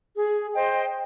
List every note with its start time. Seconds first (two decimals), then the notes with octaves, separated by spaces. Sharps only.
0.17 G#4
0.54 C5 D#5 G5